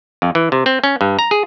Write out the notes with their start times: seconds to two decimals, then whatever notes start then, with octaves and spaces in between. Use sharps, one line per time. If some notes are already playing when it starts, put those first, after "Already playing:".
0.22 F2
0.35 E3
0.52 C3
0.66 C4
0.84 C#4
1.01 G2
1.19 A#5
1.31 G#4